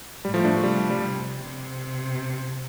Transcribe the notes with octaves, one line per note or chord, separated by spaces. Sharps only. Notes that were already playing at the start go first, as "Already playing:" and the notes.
A2 G3
F3 A3
A3 D4
A3
C3 G3
G3
C3